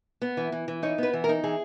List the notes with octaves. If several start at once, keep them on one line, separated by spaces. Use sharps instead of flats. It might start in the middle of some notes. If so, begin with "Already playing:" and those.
B3
E3
E3
E3
D#4 C#5
B3 B4
E3
A#4
D#4
E3 G#4